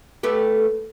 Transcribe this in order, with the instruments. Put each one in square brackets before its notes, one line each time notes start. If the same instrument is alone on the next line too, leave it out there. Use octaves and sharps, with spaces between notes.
[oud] A3 B3 G4